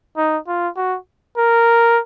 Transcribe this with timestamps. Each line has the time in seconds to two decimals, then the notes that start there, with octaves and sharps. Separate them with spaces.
0.17 D#4
0.48 F4
0.77 F#4
1.37 A#4